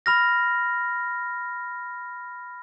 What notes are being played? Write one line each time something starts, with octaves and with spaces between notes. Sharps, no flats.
B5 F6 A#6